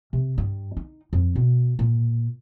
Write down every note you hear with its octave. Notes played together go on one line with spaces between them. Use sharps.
C3
G2
D#4
F2
B2
A#2